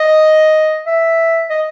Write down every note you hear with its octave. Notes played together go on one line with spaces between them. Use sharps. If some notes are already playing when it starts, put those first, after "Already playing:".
Already playing: D#5
E5
D#5